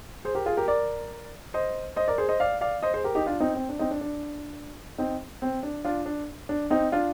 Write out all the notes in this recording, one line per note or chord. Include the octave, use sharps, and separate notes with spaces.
G#4 C5
G4 A#4
F4 G#4
G4 A#4
A#4 D5
C5 D#5
C5 D#5
A#4 D5
G#4 C5
C5 D#5
D5 F5
D5 F5
C5 D#5
G#4 C5
G4 A#4
D#4 G4
D4 F4
C4 D#4
C4
D4
C4 D#4
D4
D4
C4 D#4
C4
D4
D4 F4
D4
D4
C4 D#4
D4 F4